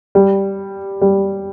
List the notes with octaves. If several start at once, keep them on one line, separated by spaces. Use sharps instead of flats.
G3
G3